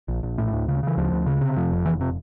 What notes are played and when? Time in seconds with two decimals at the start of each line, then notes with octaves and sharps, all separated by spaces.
0.08 A#1
0.23 A#1
0.38 A2
0.53 D2
0.68 C#3
0.83 C#3 E3
0.97 D2 F3
1.12 D2
1.26 C#3
1.41 C3
1.57 F2
1.72 F1
1.85 F1 E3
2.01 C3